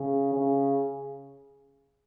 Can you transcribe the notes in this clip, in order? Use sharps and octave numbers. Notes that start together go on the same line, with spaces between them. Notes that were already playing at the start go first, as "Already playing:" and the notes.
Already playing: C#3
C#3